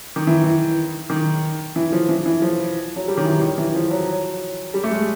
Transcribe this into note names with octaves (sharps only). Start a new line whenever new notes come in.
D#3
E3
E3
D#3
E3
F3
E3
E3
F3
F#3
G3
D#3
E3
D#3
E3
F3
F#3
G3
A3
G#3